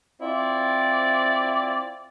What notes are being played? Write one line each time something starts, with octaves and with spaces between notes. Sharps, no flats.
C4 E4 F4 D5